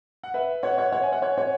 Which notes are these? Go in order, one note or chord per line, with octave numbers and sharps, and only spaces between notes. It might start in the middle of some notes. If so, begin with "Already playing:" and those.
F#5
B4 E5
C#5 F#5
C#5 F#5
C#5 F#5
E5 G#5
C#5 F#5
C#5 F#5
C#5 F#5